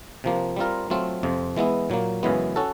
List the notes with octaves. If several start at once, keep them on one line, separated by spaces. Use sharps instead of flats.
C3 F3 A#3
G3 C4 F4 A#4
F#3 A3 C4 F4
F2 C3 F3
E3 G#3 B3 E4
A#2 F#3 A#3
F#2 C#3 E3 G#3 B3
C#4 F#4 A4